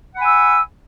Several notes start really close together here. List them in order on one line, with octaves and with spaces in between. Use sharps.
F#5 B5 G#5 E6